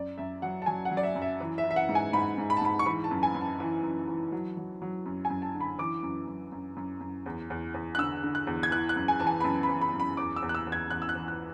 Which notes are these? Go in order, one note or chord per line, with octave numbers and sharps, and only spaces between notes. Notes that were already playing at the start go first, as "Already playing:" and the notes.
Already playing: F#2 D5
F#2 E5
F#3 F#5
A5
F#3 G#5
F#5
F#3
D5
E5
F#2
E5
E3
E5
E3
E5
F#5
G#2
G#5
G#2 B5
G#2
B5
A5
G#2 B5
C#6
E3 B5
A5
F#2
G#5
F#2
A5
E3
F#2
E3
F#3
F#3
F#3
F#2
G#5
F#2
A5
D3
B5
E3 D6
F#2
F#2
F#2
F#2
F#2
E2
E2
E2
F#6
D3 E6
D3
F#6
E2
G#6
E3 F#6
F#6
F#2
G#5
E3 A5
G#5
B5
F#2 A5
B5
E3
B5
F#2
B5
E2 D6
E6
E2
F#6
E6
E2
G#6
E2 F#6
E6
F#6
E3
F#6